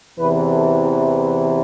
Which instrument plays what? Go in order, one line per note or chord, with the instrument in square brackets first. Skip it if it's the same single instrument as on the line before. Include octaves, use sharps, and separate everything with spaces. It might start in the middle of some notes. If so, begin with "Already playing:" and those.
[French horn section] E2 C3 E3 B4
A4